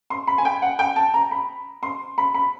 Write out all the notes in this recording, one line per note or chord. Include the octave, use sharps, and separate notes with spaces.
C6
B5
G#5
G5
F#5
G5
A5
A#5
B5
C6
B5
B5